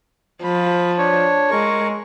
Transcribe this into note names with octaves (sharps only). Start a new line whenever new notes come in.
F3 B5
D4 C#5
G#3 A#4 C#6